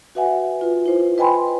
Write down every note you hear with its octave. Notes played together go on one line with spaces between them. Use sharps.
F#4 B4 E5 F#5 G#5
F4 B4
E4 C5
B4 D#5 G5 G#5 B5 C6